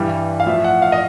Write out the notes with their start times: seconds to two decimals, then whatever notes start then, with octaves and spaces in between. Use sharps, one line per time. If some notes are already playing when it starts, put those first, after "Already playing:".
Already playing: G2 E3 G3
0.40 F5
0.46 A2 F3 E5
0.64 F#5
0.82 F5
0.92 D#5